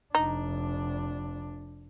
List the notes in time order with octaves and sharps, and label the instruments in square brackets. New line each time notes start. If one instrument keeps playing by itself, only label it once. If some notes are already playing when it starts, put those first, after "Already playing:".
[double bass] F1 D4 [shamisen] D#4